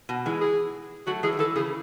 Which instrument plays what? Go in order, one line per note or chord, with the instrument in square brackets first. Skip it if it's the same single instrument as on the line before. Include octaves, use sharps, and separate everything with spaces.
[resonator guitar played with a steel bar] B2
E3 G#3
[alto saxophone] G#4
[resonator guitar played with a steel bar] F#3 A3 [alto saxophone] F#4
[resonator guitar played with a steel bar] E3 G#3 [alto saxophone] G#4
[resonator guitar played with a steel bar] F#3
[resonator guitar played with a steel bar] E3 G#3 [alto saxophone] A4
[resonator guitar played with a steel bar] C#3 E3 [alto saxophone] G#4